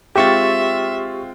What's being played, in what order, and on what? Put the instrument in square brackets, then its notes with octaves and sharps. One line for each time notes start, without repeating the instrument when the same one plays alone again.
[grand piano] G#3 C4 F4 [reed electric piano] G4 C#6 A6 [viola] E5